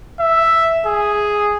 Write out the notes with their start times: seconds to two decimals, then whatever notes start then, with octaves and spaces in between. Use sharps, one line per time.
0.20 E5
0.86 G#4